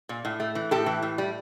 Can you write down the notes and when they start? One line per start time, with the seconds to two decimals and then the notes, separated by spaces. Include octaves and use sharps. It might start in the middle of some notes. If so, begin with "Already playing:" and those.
0.09 A#2
0.25 A2
0.40 A3
0.55 E3
0.71 A2 G4 A4
0.86 E3
1.02 A2
1.18 G3